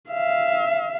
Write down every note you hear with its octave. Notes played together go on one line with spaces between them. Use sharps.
E5 F5